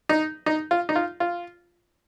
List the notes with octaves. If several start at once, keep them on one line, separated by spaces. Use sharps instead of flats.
D#4
D#4
F4
D#4
F4
F4